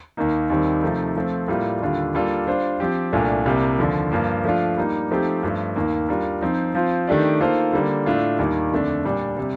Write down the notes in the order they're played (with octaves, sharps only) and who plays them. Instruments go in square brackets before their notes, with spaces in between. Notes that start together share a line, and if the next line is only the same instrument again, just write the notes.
[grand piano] D#2 D#3 A#3 D#4
D#2 D#3 G3 C4
C3 F3 A3 D#4
F3 A3 C4
A2 G3 A#3 F4
D#2 D3 G3 D4 F4
G3 A#3 D4 F4 A4
G3 D4 F4 C5
F3 C4 G4
C2 A#2 A3 D4 F4
C2 C3 G3 A#3
D#2 D3 F3
G2 F3 A#3
F3 A3 D4 F4
G3 A#3 D#4
F3 A3 C4 D#4 G4
G2 F3 A3
D#2 D#3 A#3
G3 D4 F4 A#4
F3 C4 D#4
F3 C4 F4
D#3 A3 D4 G4 D5
D#3 A#3 F4 A4 C5
D3 G3 A#3
A2 A3 D4 F4
D#2 D#3 G3 A#3
F2 D3 A3 D4
A#2 G3 D4
C3 G3